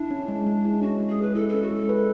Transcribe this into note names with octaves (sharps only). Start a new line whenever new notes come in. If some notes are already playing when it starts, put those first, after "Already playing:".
Already playing: D4 E4
C#4
G#3
G#3
E4
C#4 F#4
G#3
G#4
G#3 B4
E4 A4
C#4 A4
F#4
G#3 A4
B4